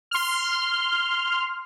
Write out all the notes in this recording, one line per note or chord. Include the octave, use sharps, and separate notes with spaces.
C6 F6